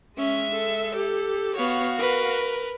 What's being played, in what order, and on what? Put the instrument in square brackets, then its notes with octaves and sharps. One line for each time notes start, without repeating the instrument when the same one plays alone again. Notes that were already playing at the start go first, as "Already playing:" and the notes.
[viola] G#3 E5 [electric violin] C#4
[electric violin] A4
[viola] G4
[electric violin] B3 C#5 [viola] F#4 F5
[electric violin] A#4 B4